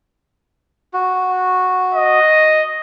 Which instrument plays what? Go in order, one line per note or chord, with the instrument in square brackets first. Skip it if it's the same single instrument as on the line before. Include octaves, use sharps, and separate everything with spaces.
[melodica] F#4
[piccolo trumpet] D#5